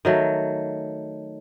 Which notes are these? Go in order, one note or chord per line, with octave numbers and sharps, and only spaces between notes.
D#3 F#3 A3